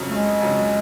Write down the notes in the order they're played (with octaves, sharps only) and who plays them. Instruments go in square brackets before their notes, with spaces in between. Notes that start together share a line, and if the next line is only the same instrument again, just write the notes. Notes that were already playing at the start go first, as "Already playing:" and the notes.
Already playing: [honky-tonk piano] F2 C#3 F#3
[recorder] A3
G#3
[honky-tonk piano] F2 C#3 F#3